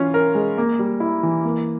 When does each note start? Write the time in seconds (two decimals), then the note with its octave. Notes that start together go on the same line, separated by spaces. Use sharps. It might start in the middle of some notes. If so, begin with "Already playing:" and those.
Already playing: E3 C#4 F4
0.14 A#4
0.35 G#3
0.58 A#3
0.79 G3
1.00 E4
1.23 E3
1.45 A#3